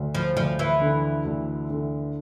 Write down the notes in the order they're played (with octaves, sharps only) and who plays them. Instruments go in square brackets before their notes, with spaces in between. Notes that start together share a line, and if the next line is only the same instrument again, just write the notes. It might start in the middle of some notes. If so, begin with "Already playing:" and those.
Already playing: [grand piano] D2
[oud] F3
[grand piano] D2 [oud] F3
[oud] E3
[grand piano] D3
D2
D3